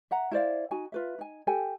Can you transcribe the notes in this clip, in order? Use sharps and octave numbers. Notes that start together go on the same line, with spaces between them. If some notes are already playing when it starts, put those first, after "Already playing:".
E5 F#5 A#5
E4 C5 D5 F5
D#4 F#4 G#5
F4 B4 E5
D#4 G#5
G4 A4 G5 G#5